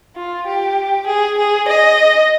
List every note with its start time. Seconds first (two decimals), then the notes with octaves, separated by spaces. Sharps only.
0.15 F4
0.46 G4
1.07 G#4
1.38 G#4
1.68 D#5